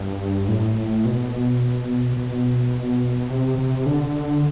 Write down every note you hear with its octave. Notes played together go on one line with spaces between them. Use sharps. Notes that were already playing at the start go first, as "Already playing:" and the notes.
Already playing: G2
A2
B2
B2
C3
C3
D3